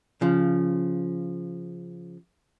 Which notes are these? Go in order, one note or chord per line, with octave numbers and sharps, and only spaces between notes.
C#3 F3